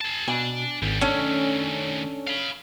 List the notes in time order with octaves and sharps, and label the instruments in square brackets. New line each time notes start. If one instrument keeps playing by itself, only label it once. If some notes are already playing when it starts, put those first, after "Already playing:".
[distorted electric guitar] G#4 A5
[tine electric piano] B2 [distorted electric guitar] D4 [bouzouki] G#5
[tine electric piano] G#1 [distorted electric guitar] D2 G3
[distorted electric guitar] D#3 A3 [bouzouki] C#4 [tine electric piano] D4 A4
[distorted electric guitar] F5 B5